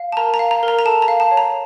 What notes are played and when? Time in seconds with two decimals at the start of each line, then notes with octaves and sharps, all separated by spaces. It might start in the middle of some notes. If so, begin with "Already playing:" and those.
Already playing: F5
0.12 A5
0.17 A#4 A#5
0.34 A#5
0.39 F5
0.51 A#5
0.63 A#4
0.68 A#5
0.79 A#5
0.85 A4 A5
1.02 A#5
1.08 F5
1.20 A5
1.31 C#5
1.37 A#5